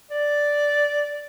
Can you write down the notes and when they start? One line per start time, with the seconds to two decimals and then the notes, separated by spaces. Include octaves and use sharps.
0.11 D5